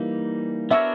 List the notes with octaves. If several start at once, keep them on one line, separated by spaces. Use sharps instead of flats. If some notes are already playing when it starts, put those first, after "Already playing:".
Already playing: E3 G3 A#3 D#4
B3 D4 F#4 A#4 C#5 E5